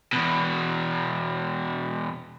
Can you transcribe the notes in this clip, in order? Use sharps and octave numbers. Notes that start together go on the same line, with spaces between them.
E2 B2